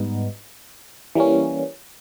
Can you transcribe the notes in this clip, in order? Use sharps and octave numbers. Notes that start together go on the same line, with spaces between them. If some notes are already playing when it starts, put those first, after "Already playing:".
Already playing: G#2 G3 B3 D#4
E3 G3 A#3 C#4